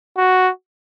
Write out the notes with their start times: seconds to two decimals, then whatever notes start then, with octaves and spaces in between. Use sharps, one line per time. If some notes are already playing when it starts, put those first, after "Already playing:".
0.18 F#4